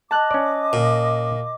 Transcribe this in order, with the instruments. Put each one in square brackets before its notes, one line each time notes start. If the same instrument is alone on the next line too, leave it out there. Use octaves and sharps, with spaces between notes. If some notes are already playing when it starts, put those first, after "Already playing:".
[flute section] D#5 D6 [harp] A5 F#6
[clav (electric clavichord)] C#4 D5
[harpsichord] A#2